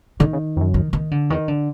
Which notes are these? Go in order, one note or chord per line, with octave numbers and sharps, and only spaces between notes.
D3 D#3
C#3
F2
F#2
D#3
D#3
D3
E2 D#3
D3